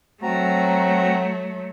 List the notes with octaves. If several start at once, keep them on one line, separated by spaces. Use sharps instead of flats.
F#3 A3 C4 F#4 A#5